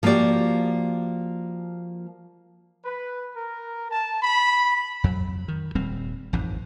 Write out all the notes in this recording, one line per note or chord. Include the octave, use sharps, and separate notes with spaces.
F3 A#3 F#4 G4 D5
B4
A#4
A5
B5
F2 F#3
D#3
D#1 G3 C4
A1 F2 G#2